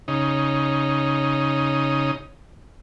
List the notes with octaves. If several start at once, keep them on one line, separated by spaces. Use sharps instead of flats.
C#3 D#4